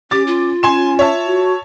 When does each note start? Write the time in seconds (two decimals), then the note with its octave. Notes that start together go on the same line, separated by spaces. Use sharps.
0.11 C#4 G4 D6 A6
0.27 F4
0.63 C#4 G#5 C6 E7
0.99 C#5 E5 A5
1.26 F#4